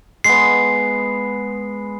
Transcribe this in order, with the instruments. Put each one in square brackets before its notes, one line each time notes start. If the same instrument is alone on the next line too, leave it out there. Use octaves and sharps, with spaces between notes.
[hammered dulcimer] G#3 B3 [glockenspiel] C7